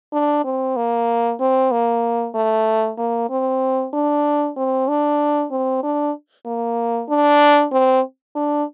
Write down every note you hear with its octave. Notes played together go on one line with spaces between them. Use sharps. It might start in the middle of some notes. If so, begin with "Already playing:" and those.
D4
C4
A#3
C4
A#3
A3
A#3
C4
D4
C4
D4
C4
D4
A#3
D4
C4
D4